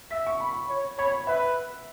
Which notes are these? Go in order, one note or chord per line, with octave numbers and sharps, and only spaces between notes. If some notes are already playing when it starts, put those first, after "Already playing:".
E5 B6
C#6
B5
C#5
C#5 B5
B4 E5